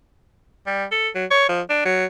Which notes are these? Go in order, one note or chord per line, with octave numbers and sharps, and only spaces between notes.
G3
A4
F#3
C#5
F3
D4
F#3